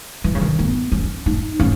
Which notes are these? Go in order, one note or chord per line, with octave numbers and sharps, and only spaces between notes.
E3
C#3
D#3
B3
C#4
D#4
C#4